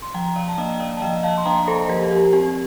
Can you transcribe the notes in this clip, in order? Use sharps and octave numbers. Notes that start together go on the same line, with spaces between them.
C6
F3 G5 A#5
D5 F5
A5
A#3 D4 D#5 G5
G5
D5 F5
A5
F3 D#5 G5
F5 A5
C6
A#3 D4 G5 A#5
A4 C5
F3 G4 A#4
G4
C4 G4